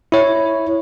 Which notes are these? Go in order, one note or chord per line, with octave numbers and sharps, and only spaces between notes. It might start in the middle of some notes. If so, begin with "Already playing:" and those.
E4 C#5